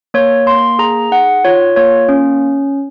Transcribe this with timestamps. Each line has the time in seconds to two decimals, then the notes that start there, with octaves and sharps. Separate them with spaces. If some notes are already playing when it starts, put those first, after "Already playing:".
0.14 A#3 C#5
0.46 A#3 C6
0.79 G#4 A#5
1.11 D#4 F#5
1.45 F4 C#5
1.76 A#3 C#5
2.09 C#4